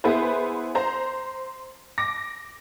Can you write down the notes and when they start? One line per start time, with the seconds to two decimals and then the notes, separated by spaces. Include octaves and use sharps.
0.04 B3 E4 G#4 B4 C5
0.75 C5 A#5
1.98 D6 A#6